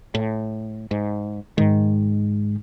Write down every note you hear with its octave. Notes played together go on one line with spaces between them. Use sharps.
A2
G#2
G#2 D#3 G#3